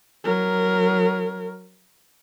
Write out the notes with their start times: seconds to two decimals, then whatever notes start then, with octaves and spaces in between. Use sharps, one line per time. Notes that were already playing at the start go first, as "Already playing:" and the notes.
0.24 F#3 A#4